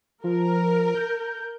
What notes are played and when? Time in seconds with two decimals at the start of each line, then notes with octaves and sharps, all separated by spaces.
0.24 F3 A#4
0.95 G6